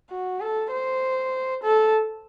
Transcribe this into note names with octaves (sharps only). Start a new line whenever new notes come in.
F#4
A4
C5
A4